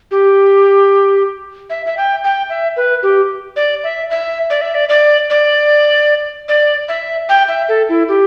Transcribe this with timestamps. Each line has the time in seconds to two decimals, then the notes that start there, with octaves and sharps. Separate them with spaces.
0.11 G4
1.70 E5
1.86 E5
1.97 G5
2.24 G5
2.50 E5
2.77 B4
3.03 G4
3.56 D5
3.84 E5
4.10 E5
4.50 D5
4.61 E5
4.75 D5
4.89 D5
5.30 D5
6.49 D5
6.89 E5
7.29 G5
7.48 E5
7.69 A4
7.89 E4
8.08 G4